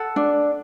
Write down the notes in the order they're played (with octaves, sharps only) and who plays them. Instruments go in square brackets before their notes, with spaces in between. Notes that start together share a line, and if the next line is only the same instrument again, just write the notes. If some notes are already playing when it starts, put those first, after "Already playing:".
Already playing: [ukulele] A4 F#5
D4